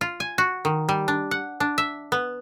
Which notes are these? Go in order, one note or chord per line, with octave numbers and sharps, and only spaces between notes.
F4
G#5
F#4
D#3
G3
D4
F#5
D4
E5
B3